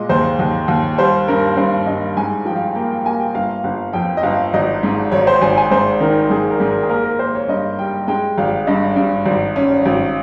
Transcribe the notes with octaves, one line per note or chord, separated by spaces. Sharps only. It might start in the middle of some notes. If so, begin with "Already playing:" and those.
Already playing: A#2 G#3 D#5
D#2 C5
D#2
D#2
G3 C5
G2 A#4
G2 C5
G2 D#5
G#2 G#5
F3 G5
F5
A#3 G5
G5
A#3 G#5
G5
G1 F5
G1
F2 G5
D#5
G1 F5
G#1 D#5
G#2
G#1 C#5
C5
G#1 G#5
G#5
G#2 C5
D#3 A#4
G#2 G#4
A#4
G#2
A#4
G#4
A#3 A#4
A#4
A#3 C5
C#5
G2 D#5
G3 G5
G#3 G5
G#1 F5
G2 D#5
G2
G#1
C#4
G#1